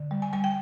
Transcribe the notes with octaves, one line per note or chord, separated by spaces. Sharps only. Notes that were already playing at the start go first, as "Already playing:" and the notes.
Already playing: D3
G3
G#5
G3 G#5
G5